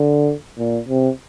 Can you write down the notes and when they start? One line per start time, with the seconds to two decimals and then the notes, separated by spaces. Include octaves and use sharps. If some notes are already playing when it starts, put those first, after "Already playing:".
Already playing: D3
0.58 A#2
0.89 C3